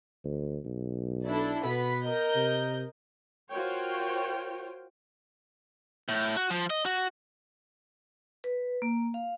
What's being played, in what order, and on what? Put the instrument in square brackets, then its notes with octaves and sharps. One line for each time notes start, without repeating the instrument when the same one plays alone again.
[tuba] D2
B1
[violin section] D4 E4 A4
[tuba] B2 [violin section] B3 B5 B6
[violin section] A#4 D#5 G6
[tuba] C3
[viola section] F4 F#4 A#4 C5 C#5 G5
[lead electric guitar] A2
F#4
F3
D#5
F#4
[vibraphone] B4
A#3
F5